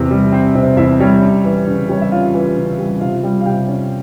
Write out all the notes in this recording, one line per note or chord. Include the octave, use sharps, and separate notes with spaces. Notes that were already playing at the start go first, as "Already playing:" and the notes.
Already playing: E2 C3 C4
G3
C4
C3
E2 E4 E5
G3 C#5
C#4
E3
C#3
G3 C#5
E5
C#4 F4 F5
E3
C#3
G3
C3 F4 F5
G3
F5
C3 G4 G5
C#4